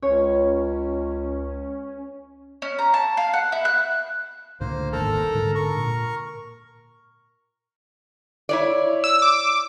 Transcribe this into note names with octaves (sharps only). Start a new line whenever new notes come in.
C#2 C#4 C#5
C#4
A#5
A5
F5
F#5
E4
F#6
C#2 A2 D3 A#3 C5
D#1 G#1 D#2 A4 A#4 A#5
G#2 D3 G#3
A#4 C#6
A#2
E4 C#5 D5
E6
D6